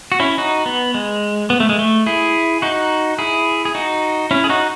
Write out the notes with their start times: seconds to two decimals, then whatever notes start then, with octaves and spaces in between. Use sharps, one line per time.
0.12 F#4
0.20 C#4 E4
0.38 D#4 F#4
0.66 B3
0.94 G#3
1.50 B3
1.60 A3
1.69 G#3
1.79 A3
2.06 E4 G#4
2.62 D#4 F#4
3.19 E4 G#4
3.65 G#4
3.75 D#4 F#4
4.31 C#4 E4
4.44 G#4
4.50 D#4 F#4